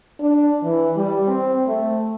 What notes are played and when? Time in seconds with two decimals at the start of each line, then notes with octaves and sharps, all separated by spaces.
0.20 D4
0.63 E3
0.96 G3
1.28 C4
1.67 A3